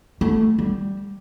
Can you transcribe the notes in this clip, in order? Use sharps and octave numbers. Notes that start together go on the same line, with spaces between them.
A3
G3